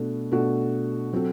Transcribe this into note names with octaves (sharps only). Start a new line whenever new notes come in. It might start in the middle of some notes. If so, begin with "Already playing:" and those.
Already playing: B2 A3 D4 F#4 A4
B2 A3 D4 F#4 A4
F#3 C4 F#4 A4